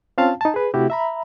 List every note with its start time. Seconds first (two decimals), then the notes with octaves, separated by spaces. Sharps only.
0.18 C4 C#4 F4 F5 A5
0.41 D#4 A5
0.54 G#4 B4
0.74 C3 A3 E4 F#4 G4
0.90 E5 A#5 B5